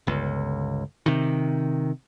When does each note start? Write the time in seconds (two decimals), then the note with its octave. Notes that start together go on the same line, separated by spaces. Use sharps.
0.07 G1 C#2
1.06 C3 D#3